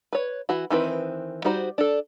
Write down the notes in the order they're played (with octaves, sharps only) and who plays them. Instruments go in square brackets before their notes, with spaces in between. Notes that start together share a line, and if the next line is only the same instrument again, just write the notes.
[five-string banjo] B4 C#5
E3 F#4
D#3 E3 C4 B4
G3 D#4 F#4 C5
D4 A4